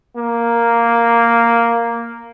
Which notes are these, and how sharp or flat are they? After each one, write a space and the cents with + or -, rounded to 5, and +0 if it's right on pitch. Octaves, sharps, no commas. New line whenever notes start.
A#3 +0